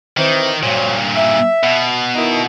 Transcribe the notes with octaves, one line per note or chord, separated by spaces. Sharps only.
D#3 E3 C4
G2 A#2 F#3 C5 C#5
E5
B2
D#3 D#4 E4